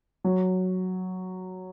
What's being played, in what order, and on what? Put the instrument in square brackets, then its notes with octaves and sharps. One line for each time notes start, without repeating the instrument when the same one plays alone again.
[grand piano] F#3